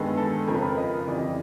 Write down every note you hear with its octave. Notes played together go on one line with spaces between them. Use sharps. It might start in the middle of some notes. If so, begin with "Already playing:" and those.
Already playing: G2 D#3 G#3 B3 A4
A4
F2 C#3 F3 A#4
B4
A#4
D#5
F2 C#3 E3 G3 D5
D#5